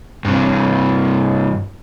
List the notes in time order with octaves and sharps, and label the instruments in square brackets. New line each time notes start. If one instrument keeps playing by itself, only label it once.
[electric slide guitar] G2 C3